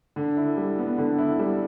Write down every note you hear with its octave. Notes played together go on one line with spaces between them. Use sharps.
D3
E4
G3
B3
D3
E4
G3